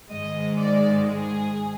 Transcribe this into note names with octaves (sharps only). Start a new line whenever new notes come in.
G#2 D#3 G#3 D#5
D5
G#4